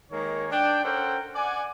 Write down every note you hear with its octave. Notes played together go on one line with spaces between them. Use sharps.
D#3 G#3 A#3 G#4 C#5
D4 G5
C#4 A4 A#4 C5 F#5 G5
D5 F#5 G#5